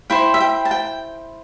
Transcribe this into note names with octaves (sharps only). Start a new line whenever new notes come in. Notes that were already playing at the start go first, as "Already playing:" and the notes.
E4 C5 G5
E5
G5
A5
G5